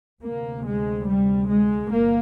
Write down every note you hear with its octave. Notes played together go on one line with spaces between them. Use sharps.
D2 C3 A#3
G#3
G3
G#3
G1 A#3